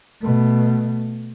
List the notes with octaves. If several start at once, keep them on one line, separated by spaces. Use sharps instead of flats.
B2 A3